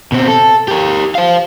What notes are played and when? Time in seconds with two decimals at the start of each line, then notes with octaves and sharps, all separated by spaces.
0.12 B2 C4
0.28 A4
0.68 G4 A#4
1.15 C5 F5